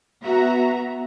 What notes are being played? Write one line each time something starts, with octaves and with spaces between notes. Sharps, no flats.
B3 F#4 E5 A#5